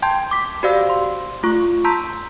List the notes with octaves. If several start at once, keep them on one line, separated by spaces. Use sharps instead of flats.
G5 A5 C6 G6 G#6
D6 B6
F#4 G4 C5 D5 F5 E6
C6
A3 F4 C#6
A5 A#5 C6 E6 G6 B6